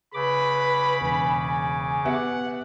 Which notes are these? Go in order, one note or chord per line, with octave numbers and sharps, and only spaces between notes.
C#3 B4 B5 D6
E1 G#5
B3 G4 E5 F#5